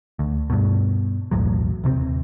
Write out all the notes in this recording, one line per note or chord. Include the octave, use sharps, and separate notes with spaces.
D2
G2 B2
B1 E2 A2 F#3
D#1 C3 A#3 C4